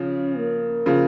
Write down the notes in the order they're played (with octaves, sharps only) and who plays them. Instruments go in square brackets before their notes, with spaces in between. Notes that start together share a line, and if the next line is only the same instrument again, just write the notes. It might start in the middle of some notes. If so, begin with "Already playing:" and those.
Already playing: [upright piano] C#3 F3 [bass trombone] C#4
[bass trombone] A#3
[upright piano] C#3 F3